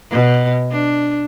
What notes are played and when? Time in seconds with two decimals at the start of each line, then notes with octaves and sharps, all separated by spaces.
0.11 B2
0.71 D4